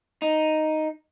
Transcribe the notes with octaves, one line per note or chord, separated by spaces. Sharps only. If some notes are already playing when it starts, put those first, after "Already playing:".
D#4